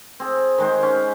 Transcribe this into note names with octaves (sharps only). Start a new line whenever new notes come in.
C4 G#4
D#3 G#3 C5
C#4